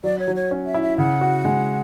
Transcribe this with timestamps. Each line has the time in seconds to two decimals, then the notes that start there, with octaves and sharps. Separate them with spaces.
0.04 F#3 D5
0.19 C#5
0.28 F#3
0.36 C#5
0.51 C#4
0.66 E5
0.74 E4
0.83 E5
0.98 C#3 F#5
1.21 F#4
1.45 G#3